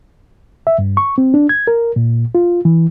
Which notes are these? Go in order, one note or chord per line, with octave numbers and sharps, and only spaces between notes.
E5
G2
C#6
C4
D4
G#6
A#4
A#2
F4
E3